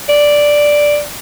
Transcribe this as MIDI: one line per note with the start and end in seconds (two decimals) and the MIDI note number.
0.09 1.02 74